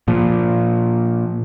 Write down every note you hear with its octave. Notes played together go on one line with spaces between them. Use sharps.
A#2 F3